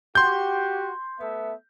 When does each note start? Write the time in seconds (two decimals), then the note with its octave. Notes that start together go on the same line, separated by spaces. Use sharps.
0.15 F#4 G4 C6 G6
1.20 A3 B3 E5